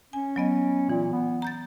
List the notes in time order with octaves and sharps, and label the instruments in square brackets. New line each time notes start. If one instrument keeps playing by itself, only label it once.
[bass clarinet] C#4 [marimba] G#5
[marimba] F#3 B3 D#5
[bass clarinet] A#2 [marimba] E3
[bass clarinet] B3
[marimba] A#5 G6 A6